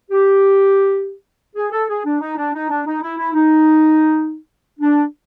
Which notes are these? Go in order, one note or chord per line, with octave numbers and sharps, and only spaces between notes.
G4
G#4
A4
G#4
D4
D#4
D4
D#4
D4
D#4
E4
E4
D#4
D4